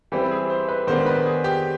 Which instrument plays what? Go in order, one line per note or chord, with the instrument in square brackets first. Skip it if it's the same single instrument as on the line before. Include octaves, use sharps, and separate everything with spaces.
[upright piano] E3 G3 C4 [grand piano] G4
[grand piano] G#4
C5
B4
[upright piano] D#3 G#3 B3 D4 [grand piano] C5
[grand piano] B4
G#4
G4